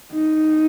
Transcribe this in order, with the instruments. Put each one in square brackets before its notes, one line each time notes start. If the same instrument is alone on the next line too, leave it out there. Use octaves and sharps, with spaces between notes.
[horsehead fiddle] D#4